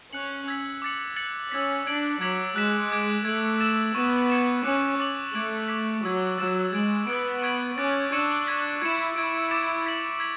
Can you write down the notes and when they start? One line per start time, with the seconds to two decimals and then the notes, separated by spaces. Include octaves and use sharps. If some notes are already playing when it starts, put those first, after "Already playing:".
0.13 C#4 F#6 C#7 F#7
0.48 E6 G#6 B6
0.82 D6 A6 C#7 F#7
1.16 F#6 A6 C#7 F#7
1.51 C#4 E6 G#6 B6
1.86 D4 G#6 D7 F#7
2.21 F#3 D6 G#6 B6 F#7
2.56 G#3 F#6 B6 E7
2.91 D6 G#6 D7
3.25 A3 G#6 D7 F#7
3.61 E6 A6 E7
3.95 B3 C#6 E6 A6 E7
4.30 G#6 C#7 E7
4.64 C#4 D6 F#6 C#7 F#7
5.00 D6 A6 C#7 F#7
5.33 A3 D6 G#6 D7 F#7
5.68 D6 G#6 B6
6.03 F#3 C#6 E6 G#6 B6
6.38 F#3 E6 A6 E7
6.73 G#3 G#6 D7 F#7
7.07 B3 E6 G#6 D7
7.42 C#6 G#6 D7 F#7
7.78 C#4 D6 F#6 A6 D7
8.11 D4 C#6 E6 G#6 C#7 E7
8.47 C#6 G#6 B6
8.82 E4 G#6 C#7 E7
9.16 E4 C#6 G#6 D7
9.51 D6 A6 E7
9.86 G#6 B6 F#7
10.20 G#6 B6 F#7